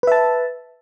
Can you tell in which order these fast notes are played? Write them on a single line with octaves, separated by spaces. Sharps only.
B4 E5 A5